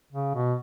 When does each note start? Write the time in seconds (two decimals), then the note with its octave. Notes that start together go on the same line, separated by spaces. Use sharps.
0.12 C#3
0.34 B2